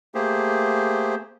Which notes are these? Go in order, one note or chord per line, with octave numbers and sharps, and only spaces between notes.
A3 A#3 G4 G#4 C5